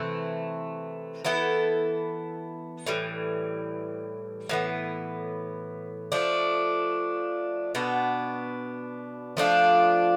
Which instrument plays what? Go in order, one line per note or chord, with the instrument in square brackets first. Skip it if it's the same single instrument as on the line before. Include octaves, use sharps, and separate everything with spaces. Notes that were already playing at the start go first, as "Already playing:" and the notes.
Already playing: [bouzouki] C3 E3 A3 E4
E3 B3 E4 A4
A2 E3 G3
A2 E3 B3
F3 A3 D4
B2 B3 D4
F3 A3 D4 F4